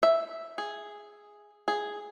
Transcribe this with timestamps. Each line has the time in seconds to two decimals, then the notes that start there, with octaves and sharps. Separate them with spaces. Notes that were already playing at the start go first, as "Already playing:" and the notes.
0.03 E5
0.58 G#4
1.68 G#4